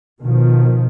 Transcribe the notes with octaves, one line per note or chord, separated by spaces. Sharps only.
B2 D#3 F3